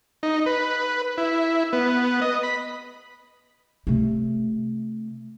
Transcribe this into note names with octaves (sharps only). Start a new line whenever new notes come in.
D#4
B4
E4
B3
D#5
B5
C3 A3